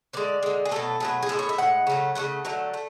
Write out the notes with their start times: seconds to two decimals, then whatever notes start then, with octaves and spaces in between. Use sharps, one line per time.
0.13 D3 G#3 D5
0.43 D3 G#3
0.65 G#4
0.71 B2 F#3 A3 A4
1.00 B2 F#3 A3 G#4
1.23 G#4
1.29 A2 G#3 A4
1.39 C#5
1.49 E5
1.58 A2 G#3 F#5
1.87 C#3 F#3 A3
2.15 C#3 F#3 A3 F#5
2.45 D3 F#3 A3
2.74 A3